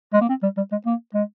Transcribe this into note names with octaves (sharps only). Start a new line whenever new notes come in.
G#3
A#3
C4
G3
G3
G#3
A#3
G#3